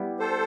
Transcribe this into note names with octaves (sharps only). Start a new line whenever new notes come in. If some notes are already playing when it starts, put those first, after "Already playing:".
Already playing: G3 B3 E4 G4
A4 C5